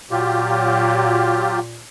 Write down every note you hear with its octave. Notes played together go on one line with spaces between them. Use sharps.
A#2 F#3 F4 G4